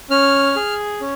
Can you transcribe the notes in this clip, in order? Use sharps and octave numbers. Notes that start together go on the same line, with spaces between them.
C#4 F6
G#4
C#4